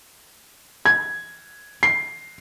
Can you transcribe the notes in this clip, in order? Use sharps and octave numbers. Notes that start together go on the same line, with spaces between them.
G#6
C7